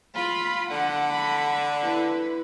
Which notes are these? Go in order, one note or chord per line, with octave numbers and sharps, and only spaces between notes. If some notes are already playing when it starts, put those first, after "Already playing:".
F4 B5
D3 F#5
B5
E4 B4